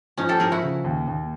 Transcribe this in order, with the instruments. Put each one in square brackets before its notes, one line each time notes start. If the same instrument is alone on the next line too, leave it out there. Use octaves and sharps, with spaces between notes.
[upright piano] F3 [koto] C#4 D#4
[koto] G4 A4
[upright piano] F3 [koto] G#4 A#4
[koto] E4 F#4
[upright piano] C#3
D#2
D#2